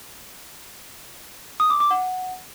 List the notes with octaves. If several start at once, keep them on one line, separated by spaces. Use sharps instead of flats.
D#6
D6
D6
F#5